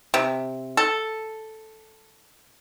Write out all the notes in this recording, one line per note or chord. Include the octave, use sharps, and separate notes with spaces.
C3
A4